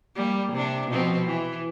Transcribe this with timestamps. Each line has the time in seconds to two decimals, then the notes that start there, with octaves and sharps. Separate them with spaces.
0.16 G3 A#3
0.53 C3 D4
0.88 B2 F3 C4
1.25 E3